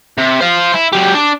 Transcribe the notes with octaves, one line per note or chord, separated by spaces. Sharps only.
C3
C5 F5
E4
F#3 G4
D4